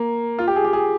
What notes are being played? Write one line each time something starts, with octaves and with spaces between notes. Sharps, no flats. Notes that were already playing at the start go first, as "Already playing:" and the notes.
Already playing: A#3
F4
G4
G#4
G4
G#4